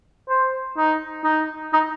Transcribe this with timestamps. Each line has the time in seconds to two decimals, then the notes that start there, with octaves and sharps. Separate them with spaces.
0.29 C5
0.77 D#4
1.24 D#4
1.73 D#4